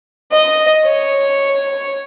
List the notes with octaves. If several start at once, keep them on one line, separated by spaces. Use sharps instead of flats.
D#5
C#5